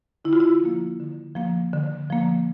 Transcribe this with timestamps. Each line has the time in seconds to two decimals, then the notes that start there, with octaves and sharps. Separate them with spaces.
0.25 D3 E4
0.33 F4
0.40 E4
0.62 F3 A#3
1.00 D3
1.36 F3 A#3
1.73 D3
2.10 F3 A#3